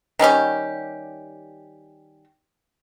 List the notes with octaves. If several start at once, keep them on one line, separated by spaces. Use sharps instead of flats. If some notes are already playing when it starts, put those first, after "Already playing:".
D#3 G3 C#4 G4